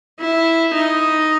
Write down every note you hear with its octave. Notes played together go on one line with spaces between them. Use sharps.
E4
D#4